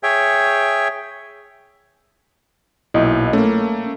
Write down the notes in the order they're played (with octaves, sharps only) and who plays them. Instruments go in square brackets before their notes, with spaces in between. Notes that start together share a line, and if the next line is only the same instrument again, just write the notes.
[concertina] G#4 C#5 E5 G5
[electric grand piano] B1 A#2 [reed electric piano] E4 D#5
[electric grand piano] A3 A#3 [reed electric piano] C#4